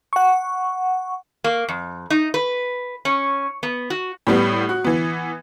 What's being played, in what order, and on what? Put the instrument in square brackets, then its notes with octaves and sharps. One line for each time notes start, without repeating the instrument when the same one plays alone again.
[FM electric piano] F#5 C#6
[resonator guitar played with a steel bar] A#3
F2
D#4
B4
C#4
B3
F#4
[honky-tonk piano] A2 G3 B3
F#4
E3 B3